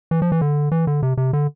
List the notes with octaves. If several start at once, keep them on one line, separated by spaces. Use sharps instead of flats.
E3
F3
E3
D3
E3
D3
C3
C3
D3